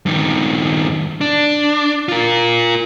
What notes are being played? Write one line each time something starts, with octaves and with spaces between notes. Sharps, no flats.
G2 D#3
D4
F4 A#4